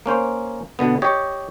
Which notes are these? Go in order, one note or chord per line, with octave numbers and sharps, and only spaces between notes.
A#3 C#4 C5
B2 D3 B3
G4 C#5 D#5